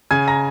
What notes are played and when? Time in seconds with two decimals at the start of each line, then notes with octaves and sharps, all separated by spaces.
0.11 C#3 G#5 G#6
0.28 A#5 A#6